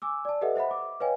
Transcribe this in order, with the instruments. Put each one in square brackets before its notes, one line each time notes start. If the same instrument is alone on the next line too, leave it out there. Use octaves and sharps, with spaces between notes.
[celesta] G#5 D6 E6
D5 A5
G4 A4 B4 D#5 E5 F#5
C5 E5 F#5 B5
D6
B4 C#5 D#5 F5 G5 G#5